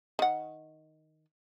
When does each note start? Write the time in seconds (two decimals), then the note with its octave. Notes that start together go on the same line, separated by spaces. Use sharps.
0.19 D#3 F#5